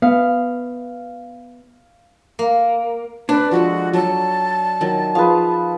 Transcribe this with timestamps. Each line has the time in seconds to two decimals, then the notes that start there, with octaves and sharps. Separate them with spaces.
0.02 B3 F5
2.39 A#3
3.29 D4 B4 D5
3.51 F3 G#3 F#4 A4
3.93 F#3 A5
4.81 D#3 F#3
5.15 F3 G#4 B4 F5